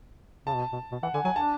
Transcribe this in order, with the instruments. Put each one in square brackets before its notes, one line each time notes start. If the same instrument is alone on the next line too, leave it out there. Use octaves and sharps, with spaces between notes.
[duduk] C#3 [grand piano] A5
[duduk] B2
B2
B2
[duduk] E3 [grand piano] F#5
[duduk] D3 [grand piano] G#5
[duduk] F#3 [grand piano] G#5
[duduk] D4 [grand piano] A5